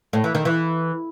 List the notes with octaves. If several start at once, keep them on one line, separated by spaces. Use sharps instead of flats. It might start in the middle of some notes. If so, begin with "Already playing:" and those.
A2
E3
D#3
E3